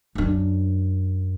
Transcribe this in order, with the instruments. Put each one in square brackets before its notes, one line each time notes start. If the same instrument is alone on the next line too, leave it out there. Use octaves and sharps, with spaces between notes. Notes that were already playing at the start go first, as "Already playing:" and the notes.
[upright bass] F#2 D4